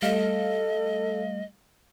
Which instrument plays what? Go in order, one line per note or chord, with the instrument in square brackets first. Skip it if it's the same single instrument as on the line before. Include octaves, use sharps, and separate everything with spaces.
[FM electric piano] G3 A3 F5 [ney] A4 [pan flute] D#5